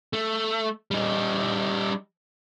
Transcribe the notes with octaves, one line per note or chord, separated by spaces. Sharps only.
A3
G3 D#4